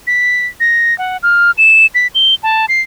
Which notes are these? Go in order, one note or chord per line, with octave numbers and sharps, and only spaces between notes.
B6
A#6
F#5
F6
E7
B6
G7
A5
C7